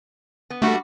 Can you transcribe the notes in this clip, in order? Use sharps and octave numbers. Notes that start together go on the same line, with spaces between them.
B3
G3 A3 D4 F#4